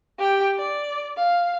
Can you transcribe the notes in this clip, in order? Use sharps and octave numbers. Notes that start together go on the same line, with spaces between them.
G4 G5
D5
F5